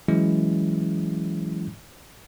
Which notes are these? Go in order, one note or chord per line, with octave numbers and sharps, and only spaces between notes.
E3 F#3 G#3 C#4 E4